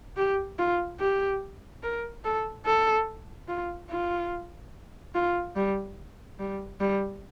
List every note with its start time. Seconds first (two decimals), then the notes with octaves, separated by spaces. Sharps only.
0.17 G4
0.59 F4
1.00 G4
1.83 A#4
2.25 A4
2.66 A4
3.48 F4
3.90 F4
5.15 F4
5.56 G3
6.39 G3
6.80 G3